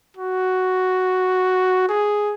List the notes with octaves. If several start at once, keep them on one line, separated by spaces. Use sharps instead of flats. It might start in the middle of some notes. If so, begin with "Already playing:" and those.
F#4
G#4